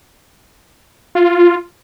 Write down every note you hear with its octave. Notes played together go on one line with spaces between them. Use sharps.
F4